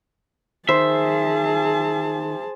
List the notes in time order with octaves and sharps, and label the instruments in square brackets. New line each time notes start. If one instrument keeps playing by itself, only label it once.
[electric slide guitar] D#3 [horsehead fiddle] G#4 A5 [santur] C5 [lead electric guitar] E5